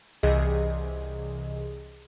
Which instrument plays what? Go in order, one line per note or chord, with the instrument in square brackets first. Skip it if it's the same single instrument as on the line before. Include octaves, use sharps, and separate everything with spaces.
[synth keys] C2 C3 E3 G#4 D#5